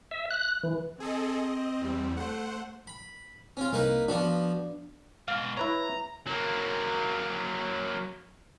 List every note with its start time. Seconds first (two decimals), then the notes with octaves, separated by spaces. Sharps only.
0.11 E5
0.31 F#6
0.63 E3
1.00 C4 G#4 A4 D#5
1.38 D#5
1.81 E2 G3
2.17 A3 C5 F#5
2.87 B5
3.57 C4 C#4 F4
3.73 C2 A#3 D#4 B4
4.08 F3 B3 D4 F#4 D5
5.28 G#2 B2 F5
5.57 E4 B4 C#5 A#5
6.27 F#3 A#3